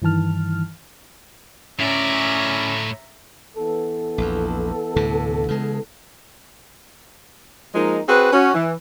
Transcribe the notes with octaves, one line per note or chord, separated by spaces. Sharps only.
G2 D#3 E3 A5 F6
A2 C#4 D5 E5 A#5
E3 B3 A4
A#1 E2
D2 A2 C3
C#3 G#3
F3 G#3 A#3 D#4
C4 F#4 G#4 B4
C#4 F#4
E3